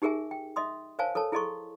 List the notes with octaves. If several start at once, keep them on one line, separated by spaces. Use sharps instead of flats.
D#4 G4 G#4 A#4 E5 G#5
G5
D#5 E5 C6 D#6
A#4 C5 C#5 F5 G#5 A5
A4 A#4 C#5 A5
E4 G#4 A4 D#5 C6 C#6